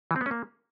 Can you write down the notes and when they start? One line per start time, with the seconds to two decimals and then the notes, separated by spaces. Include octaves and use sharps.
0.11 E3
0.16 C4
0.21 B3
0.26 C#4
0.31 A#3